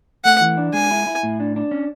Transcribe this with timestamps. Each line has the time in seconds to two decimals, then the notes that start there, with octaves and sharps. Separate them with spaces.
0.25 A3 F#5
0.41 E3
0.57 D4
0.73 G#3 G#5
0.91 E4
1.07 E4
1.23 A2
1.40 D4
1.56 D4
1.71 C#4